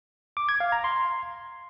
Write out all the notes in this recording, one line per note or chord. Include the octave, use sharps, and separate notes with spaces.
D6
G#6
F5
A#5
C6